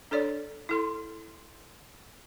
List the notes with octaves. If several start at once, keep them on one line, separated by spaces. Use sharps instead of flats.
D4 A4 C#5 D5
E4 A4 C6